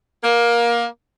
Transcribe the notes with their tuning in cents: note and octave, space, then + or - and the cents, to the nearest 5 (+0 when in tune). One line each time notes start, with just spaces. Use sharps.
A#3 +20